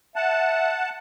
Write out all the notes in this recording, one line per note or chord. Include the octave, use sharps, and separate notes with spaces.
E5 F#5 A5